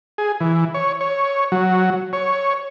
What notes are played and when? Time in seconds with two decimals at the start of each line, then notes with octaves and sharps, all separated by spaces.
0.18 G#4
0.40 E3
0.74 C#5
1.01 C#5
1.52 F#3
2.13 C#5